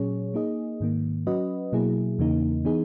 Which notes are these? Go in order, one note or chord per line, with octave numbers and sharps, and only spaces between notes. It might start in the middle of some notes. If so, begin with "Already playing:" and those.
Already playing: A#2 F#3 C#4 G#4 C#5
A#3 D#4 G#4 D#5
G#2 D#3 A#3
F#3 C#4 F#4 B4 D#5
B2 F#3 A#3 E4 G#4
E2 C#3 E3 A#3 D#4
E3 B3 D#4 G#4